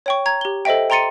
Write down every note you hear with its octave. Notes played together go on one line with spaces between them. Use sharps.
C#5 G5 C#6
A#5 G#6
G4 G7
A4 C5 D#5 E5 G5
G5 A#5 C6 A6 C#7 D#7